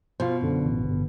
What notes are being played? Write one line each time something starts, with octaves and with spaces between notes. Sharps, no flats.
B2 F4 C5
F#2 D3
A1
G1